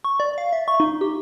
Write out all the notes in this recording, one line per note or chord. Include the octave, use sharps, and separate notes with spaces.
C#6
D5
F5
E5
C#6
D#4
G4